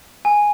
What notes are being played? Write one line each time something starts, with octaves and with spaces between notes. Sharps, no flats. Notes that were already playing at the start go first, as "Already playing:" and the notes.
G#5